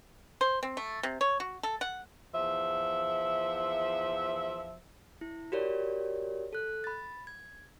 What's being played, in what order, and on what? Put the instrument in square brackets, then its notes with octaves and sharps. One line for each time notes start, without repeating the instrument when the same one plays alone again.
[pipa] C5
C4
A3
C3
C#5
F#4
A4
F#5
[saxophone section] E2 F3 E5
[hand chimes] E4
F#4 G4 A#4 C#5 D5
A4 F#6
B5 A6
G#6